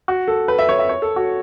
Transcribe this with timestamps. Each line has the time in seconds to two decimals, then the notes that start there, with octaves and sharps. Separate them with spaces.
0.08 F#4
0.28 A4
0.48 B4
0.59 E5
0.69 C#5
0.79 E5
0.89 C#5
1.02 A4
1.16 F#4